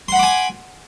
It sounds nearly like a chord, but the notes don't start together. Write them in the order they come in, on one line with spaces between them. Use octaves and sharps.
C6 F#5 B5 D6 G#5